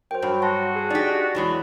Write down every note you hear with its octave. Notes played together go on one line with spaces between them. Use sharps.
F#2 C5 G5
G2 F#3
F#4 A5 C6 A#6
G#4
D4 D#4 G4 D5
E2 E3 F#3 G#3